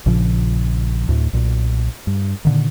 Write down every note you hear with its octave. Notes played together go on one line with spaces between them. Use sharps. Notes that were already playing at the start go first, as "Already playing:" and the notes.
A#1 A#2 C#3 F3
D2 A2
B1 A#2
G2
A#2 D3 D#3